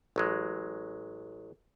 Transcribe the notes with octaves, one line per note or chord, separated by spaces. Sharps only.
A1 F#3 G#3